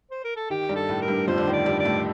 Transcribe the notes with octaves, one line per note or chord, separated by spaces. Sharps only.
C5
A#4
A4
D#3 G4
G2 G3
A4
A2 A3
A#4
G2 G3
F2 F3 C5
D3
D#3
D5
G2 G3
D5
A2 A3